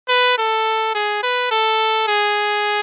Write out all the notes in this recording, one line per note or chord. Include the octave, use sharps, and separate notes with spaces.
B4
A4
G#4
B4
A4
G#4